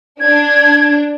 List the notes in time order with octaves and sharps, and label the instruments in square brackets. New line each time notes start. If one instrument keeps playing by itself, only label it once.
[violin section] D4 [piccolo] G#6